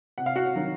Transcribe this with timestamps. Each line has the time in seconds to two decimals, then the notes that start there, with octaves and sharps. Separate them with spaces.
0.18 C3 F#5
0.26 F5
0.36 F#4 F#5
0.56 D#3 F#3